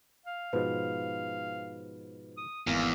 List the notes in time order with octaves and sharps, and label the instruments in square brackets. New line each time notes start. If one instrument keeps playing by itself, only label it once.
[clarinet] F5
[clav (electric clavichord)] G#2 B2 F3 [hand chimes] B4
[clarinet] D#6
[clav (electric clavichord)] G#1 A#3 G#5 [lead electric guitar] E2 [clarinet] F5